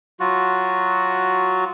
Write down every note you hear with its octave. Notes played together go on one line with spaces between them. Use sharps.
F#3 F4 F#4